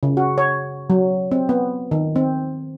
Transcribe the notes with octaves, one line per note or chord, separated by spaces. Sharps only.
C#3
F#4
C#5
F#3
C4
B3
D#3
C4